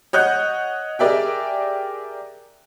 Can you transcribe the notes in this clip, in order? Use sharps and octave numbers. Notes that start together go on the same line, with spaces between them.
C#5 D#5 F#5 F#6 G6
G4 G#4 A#4 D5 E5 G5